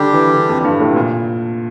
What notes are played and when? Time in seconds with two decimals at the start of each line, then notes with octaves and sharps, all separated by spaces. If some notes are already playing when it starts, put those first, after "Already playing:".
Already playing: D3 G3 D4 G4
0.13 E3
0.33 D3
0.49 F2
0.65 G2
0.80 A2
0.91 C3
0.96 A#2